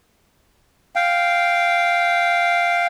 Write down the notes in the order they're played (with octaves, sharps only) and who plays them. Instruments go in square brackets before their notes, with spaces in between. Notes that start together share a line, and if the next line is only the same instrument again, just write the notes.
[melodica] F5 G5